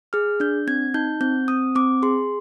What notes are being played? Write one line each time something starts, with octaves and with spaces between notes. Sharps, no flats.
G#4 F6
D4 G6
C4 G#6
D#4 G6
C4 G6
C4 D#6
C4 D6
G#4 C6